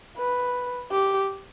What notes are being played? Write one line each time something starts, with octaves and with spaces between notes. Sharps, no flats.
B4
G4